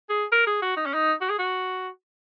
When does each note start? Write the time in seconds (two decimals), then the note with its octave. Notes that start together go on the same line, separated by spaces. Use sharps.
0.09 G#4
0.32 A#4
0.47 G#4
0.62 F#4
0.77 D#4
0.86 C#4
0.94 D#4
1.21 F#4
1.29 G#4
1.39 F#4